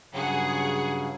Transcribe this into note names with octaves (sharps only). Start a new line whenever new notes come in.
G2 C#3 F#3 G#4 F#5